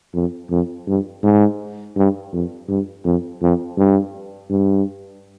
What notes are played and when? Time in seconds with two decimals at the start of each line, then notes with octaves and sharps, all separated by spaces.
0.14 F2
0.50 F2
0.87 G2
1.23 G#2
1.96 G2
2.33 F2
2.68 G2
3.05 F2
3.42 F2
3.77 G2
4.50 G2